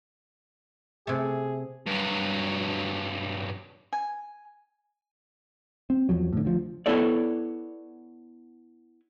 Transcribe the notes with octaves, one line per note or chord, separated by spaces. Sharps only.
C3 A3 G#4
G2 F#3
G#5
C4
E2 F3 F#3
A2 D3
D2 F3
B3 E4 A4 C#5 D5